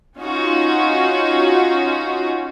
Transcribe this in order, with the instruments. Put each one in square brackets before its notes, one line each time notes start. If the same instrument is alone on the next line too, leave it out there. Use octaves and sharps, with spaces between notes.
[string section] C#4 D#4 F4 F#4